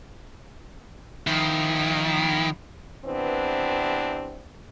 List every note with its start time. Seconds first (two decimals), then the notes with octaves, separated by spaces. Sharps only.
1.27 D#3 F3 E4
3.05 C3 E3 B3 C4 D4